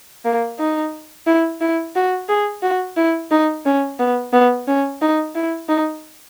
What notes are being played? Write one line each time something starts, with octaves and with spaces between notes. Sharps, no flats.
A#3
D#4
E4
E4
F#4
G#4
F#4
E4
D#4
C#4
B3
B3
C#4
D#4
E4
D#4